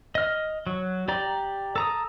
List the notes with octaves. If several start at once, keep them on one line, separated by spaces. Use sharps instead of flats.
D#5 F6
F#3
G4 D5 A#5
A4 A#5 D#6